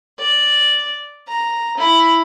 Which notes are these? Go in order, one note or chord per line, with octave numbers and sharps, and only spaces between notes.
D5
A#5
E4